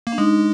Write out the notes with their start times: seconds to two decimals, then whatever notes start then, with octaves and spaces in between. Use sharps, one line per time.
0.07 A#3
0.13 D4
0.18 G#3 D#4